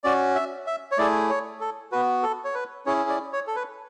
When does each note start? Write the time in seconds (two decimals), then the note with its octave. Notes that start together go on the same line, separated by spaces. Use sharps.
0.04 C#4 F#4 D5
0.35 E5
0.67 E5
0.92 C#5
0.98 A3 E4 G#4 D5
1.30 C#5
1.61 A4
1.92 B3 F#4 B4
2.23 A4
2.45 C#5
2.55 B4
2.86 C#4 E4 G#4 C#5
3.09 D5
3.33 C#5
3.47 A4
3.56 B4